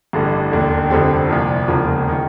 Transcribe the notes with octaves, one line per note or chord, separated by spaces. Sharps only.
A1 G2 D3 G3
E1 D#2 D3
F1 F2 D3 G3 C4
C2 A#2 F3
E1 D#2 C#3 F3 A#3
D#3